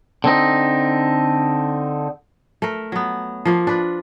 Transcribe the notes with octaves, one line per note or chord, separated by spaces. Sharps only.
D3 C4 D#4
A3 A#4
F#3 B3
F3 A#3 F4
D4 B4